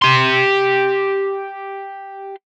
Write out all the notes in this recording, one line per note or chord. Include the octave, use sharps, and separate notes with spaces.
G4 C6